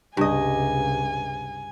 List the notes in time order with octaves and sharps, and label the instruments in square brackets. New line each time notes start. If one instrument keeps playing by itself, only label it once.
[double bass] C#2 C3 [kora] G2 D#5 [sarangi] G#5